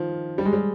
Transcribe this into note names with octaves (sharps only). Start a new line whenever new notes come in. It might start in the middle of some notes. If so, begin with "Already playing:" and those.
Already playing: D#3 F3
G3
G#3
G3